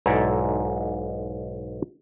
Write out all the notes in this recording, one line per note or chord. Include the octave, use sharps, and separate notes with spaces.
B1 G#2 E4 A4 D5 A#5